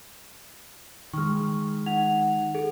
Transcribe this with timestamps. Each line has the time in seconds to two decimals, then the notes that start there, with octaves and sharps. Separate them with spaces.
1.13 D#3 G#3 C#6 F6
1.86 D#4 F#5 F7
2.55 G#4 A4